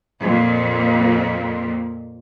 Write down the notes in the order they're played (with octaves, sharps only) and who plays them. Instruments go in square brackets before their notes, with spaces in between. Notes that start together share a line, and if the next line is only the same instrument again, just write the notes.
[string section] F2 A#2